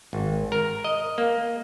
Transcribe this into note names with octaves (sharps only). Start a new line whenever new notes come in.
G#1
A#4
D#5
A#3